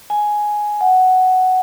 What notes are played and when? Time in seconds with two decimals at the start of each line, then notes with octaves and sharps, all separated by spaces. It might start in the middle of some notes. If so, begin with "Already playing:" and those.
0.10 G#5
0.81 F#5